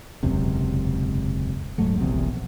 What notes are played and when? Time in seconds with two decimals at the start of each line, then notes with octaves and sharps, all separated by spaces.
0.23 E1 C#2 F#2 C3
1.78 D#1 G#2 F#3 A3
2.00 E1 A#1 E2 C3